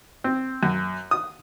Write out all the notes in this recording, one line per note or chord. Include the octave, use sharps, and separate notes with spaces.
C4
F#2
D#6